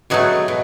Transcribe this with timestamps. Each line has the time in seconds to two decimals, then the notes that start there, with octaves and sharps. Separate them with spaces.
0.10 B2 F#3 A3 G#4
0.48 B2